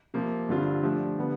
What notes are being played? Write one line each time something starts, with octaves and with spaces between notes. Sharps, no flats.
C3 F3 A#3
G2 D3 G3 C4 F4
F3 A3 D4 G4
D3 G3 B3